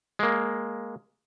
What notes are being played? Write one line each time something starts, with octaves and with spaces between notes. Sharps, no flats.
G#3 A#3